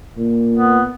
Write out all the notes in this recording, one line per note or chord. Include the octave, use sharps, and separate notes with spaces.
A#2
B3